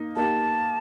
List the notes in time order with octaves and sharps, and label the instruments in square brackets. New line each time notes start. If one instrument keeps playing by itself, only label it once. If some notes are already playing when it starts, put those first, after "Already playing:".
Already playing: [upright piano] A#3 D#4
[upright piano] A#3 D#4 G4 [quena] A5